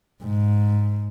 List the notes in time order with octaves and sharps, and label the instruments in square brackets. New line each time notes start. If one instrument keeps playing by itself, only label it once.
[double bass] G#2